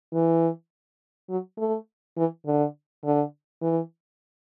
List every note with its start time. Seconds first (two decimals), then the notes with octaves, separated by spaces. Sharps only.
0.13 E3
1.29 F#3
1.58 A3
2.17 E3
2.46 D3
3.04 D3
3.62 E3